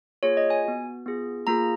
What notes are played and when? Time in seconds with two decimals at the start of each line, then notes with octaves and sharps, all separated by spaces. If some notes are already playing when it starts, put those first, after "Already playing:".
0.23 A#3 F4 G#4 C#5
0.37 D#5
0.50 G#5
0.65 B3 F#4
1.06 B3 F4 G#4
1.47 A#3 F4 G#4 A#5